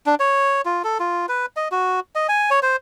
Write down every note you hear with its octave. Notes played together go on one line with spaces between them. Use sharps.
D4
C#5
F4
A4
F4
B4
D#5
F#4
D#5
G#5
C#5
C5